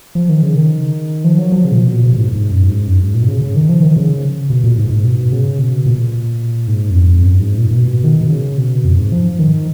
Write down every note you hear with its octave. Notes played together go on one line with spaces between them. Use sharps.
F3
D#3
C#3
D#3
F3
F#3
F3
C#3
A#2
B2
A#2
B2
A#2
G#2
G#2
F#2
G#2
F#2
G#2
A#2
B2
C#3
C#3
D#3
F3
D#3
C#3
B2
A#2
G#2
G#2
B2
C#3
B2
A#2
G#2
F#2
F2
F#2
G#2
A#2
A#2
B2
D#3
B2
C#3
B2
F2
G#2
F3
D#3